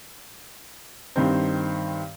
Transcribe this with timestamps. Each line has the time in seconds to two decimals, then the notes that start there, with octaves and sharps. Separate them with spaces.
1.16 G2 D#3 C4